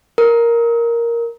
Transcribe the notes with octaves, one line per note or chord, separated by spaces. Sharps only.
A#4